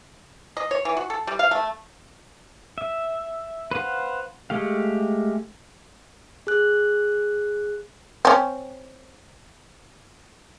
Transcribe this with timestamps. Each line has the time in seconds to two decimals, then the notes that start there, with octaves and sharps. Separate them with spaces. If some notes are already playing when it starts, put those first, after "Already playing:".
0.57 D#5
0.71 C#5
0.85 E3
0.97 F#4
1.10 A4
1.27 G3
1.39 F5
1.51 A3
2.78 E5
3.71 B4 C5 F5 F#5
4.50 G#3 A3 G4 F5
6.47 G#4 F#6
8.25 C4 C#4